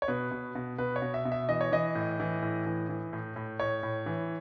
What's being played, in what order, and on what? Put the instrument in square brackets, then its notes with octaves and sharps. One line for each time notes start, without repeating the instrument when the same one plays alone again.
[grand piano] C#5
B2 B4
B2
B2
B2 B4
C#5
B2
E5
B2
E5
E3 D#5
C#5
E3 D#5
A2
E3
A2
E3
E3
A2
A2
A2 C#5
A2
E3